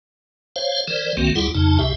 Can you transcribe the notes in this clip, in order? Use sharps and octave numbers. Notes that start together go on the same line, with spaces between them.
C5 C#5 F5
E3 A#4 C5 D5
C2 D#3 A3 A#3 C4 F#4
D2 G3 E4 F4 G#4 F#5
F2 C#3 D#4 A5
C#2 C3 G4 E5